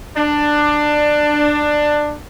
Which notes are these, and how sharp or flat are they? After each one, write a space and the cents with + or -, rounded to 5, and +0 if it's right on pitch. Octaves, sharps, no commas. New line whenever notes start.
D4 +15